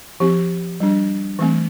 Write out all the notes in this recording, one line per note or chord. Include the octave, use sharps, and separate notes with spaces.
F3 C4 G4
G3 D4
E3 A3 C4